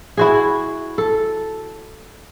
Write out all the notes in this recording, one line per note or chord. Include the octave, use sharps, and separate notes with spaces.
E4 F#4 G#4
A4